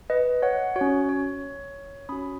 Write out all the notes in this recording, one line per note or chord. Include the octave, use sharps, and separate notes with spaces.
B4 D#5
C#5 F#5
F#4 C#5
C#4
C#5
C#4 F#4 B5 D#6